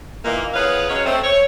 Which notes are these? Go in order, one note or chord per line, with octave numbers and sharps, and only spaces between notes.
A#2 D#3 E3 A#3
E2 B3 G#4 B4 C#5 F5
F#3 G#3 C#4 C#5
A3 C4
C#5